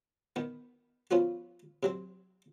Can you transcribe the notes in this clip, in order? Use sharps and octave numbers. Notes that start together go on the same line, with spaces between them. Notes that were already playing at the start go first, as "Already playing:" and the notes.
D#3 B3
F3 B3 C#4 F4 F#4
C3 F#3 C4